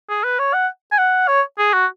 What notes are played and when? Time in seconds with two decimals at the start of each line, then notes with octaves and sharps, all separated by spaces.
0.09 G#4
0.24 B4
0.39 C#5
0.54 F#5
0.92 G#5
0.98 F#5
1.28 C#5
1.58 G#4
1.73 F#4